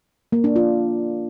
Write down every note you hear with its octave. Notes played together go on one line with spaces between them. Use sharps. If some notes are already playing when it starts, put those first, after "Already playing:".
A#3
D4
F4